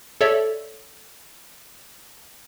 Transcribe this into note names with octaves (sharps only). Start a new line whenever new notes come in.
A4 C#5 D5 E5